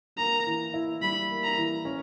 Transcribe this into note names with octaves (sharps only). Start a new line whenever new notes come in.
A#3 A#5
E3
E4
G3 B5
A#3
A#5
E3
C#4